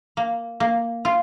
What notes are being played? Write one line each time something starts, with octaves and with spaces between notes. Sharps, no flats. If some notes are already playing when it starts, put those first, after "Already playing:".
A#3
A#3
F4